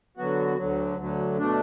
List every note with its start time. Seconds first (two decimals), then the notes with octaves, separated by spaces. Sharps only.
0.17 D3 F#3 B3 F#4
0.57 D2 D3 F#3
0.98 D2 D3 F#3
1.38 B2 A3 D4